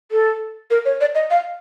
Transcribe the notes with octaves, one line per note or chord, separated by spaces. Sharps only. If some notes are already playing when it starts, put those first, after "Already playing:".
A4
A#4
C#5
D5
D#5
F5